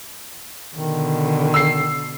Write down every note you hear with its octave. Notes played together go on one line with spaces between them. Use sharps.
B2 D3 D#3
E6 C7